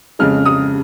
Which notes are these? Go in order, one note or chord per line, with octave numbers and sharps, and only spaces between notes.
F2 C#3 G#3 F6
D#6